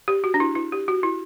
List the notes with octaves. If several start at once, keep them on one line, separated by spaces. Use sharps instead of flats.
G4
F#4
D4
E4
E4
G4
F#4
E4